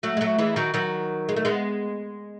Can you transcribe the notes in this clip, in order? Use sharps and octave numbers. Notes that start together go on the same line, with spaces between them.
F#3 A3
G#3
F#3 A3
E3 G#3
D#3 F#3
D#3 F#3
G#3
A3
G#3 B3